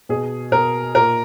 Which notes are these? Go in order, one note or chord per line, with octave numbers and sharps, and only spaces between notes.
B2 G#4
B2 A#4
A#2 A#4